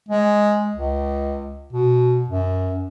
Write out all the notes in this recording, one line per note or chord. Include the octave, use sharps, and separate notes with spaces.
G#3
C#2
B2
F#2